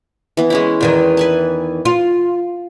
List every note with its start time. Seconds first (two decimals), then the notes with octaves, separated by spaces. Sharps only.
0.37 E3 B3
0.50 G#3 C#4 E4
0.81 E2 D#3 E3
1.17 B4 G#5 A5
1.85 F4